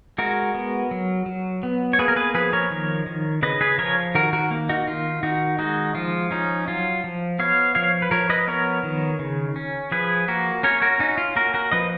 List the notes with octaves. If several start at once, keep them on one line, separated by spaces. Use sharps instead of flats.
G#3 F#4 A#4
B3
F#3
F#3
B3
C#5
A#3 G#4 B4
A#4
G#4 B4
F3 G#4 B4
A#4 C#5
D#3
D#3
C#3 B4 D#5
G#4 B4
F3 A#4 C#5
D#3 F#4 A#4
F#4 A#4
A#3
D#4 F#4
D#3 F4
D#3 D#4 F#4
G#3 D#4 F#4
F3 F4
C#4 D#4
F#3 F4
F3
B3 C#5 F5
F3 C#5 F5
B4
F3 A#4 C#5
B4 D#5
B3 A#4 C#5
D#3
C#3
C#4
F3 G#4 B4
A#3 F#4 A#4
C#4 A#4 C#5
F#4 A#4
C#4 D#4 F#4
F4
A#3 F#4 A#4
F#4 A#4
F3 B4 D#5